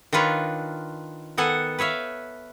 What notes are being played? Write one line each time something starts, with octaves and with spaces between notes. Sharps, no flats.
D#3 D4 F4 B4 C#5 A#5
D#3 B3 A4 F#5 G#5
B4 C#5 E5 F5